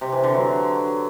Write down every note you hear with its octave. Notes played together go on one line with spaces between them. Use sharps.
C3
E3
D3
F#3